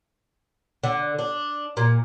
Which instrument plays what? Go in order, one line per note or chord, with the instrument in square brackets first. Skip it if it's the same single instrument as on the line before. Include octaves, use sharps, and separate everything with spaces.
[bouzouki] D3
D4
A#2